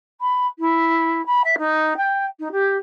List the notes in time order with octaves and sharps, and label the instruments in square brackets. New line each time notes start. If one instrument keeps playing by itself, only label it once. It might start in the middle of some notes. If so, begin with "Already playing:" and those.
[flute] B5
E4
B5
E5
D#4
G5
D#4
G4